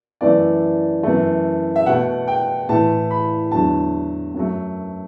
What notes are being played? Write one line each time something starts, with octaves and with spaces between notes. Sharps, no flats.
F#2 E3 A3 D5
F#2 E3 A3
E5
B2 A3 F#5
G5
A2 E3 A3 A5
B5
E2 D3 F#3 A3 A5
F#2 F#3 A3